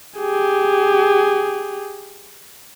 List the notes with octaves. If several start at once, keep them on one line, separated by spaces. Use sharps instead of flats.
G4 G#4